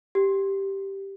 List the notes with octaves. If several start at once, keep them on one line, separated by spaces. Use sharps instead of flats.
G4